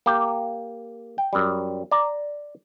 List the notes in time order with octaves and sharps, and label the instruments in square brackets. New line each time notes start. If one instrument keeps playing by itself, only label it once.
[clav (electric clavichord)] A#3 G4
G5
F#2 G3
D5 A#5